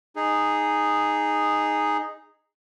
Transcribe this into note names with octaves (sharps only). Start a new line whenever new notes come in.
D#4 G#4